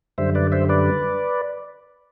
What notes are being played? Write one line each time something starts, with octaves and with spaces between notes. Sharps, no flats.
F#2 D3 G3 C5 E5
B4 D5
C5 E5
B4 D5